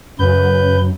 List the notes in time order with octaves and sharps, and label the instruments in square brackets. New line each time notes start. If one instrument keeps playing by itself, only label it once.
[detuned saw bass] F#2 [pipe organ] C#3 B4 G6